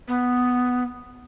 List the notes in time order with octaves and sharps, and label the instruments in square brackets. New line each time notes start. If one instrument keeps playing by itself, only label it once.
[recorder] B3